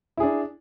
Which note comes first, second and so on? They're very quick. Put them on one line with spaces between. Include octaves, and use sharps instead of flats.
E4 G#4 D4